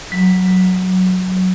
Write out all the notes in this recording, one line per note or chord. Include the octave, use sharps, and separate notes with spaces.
F#3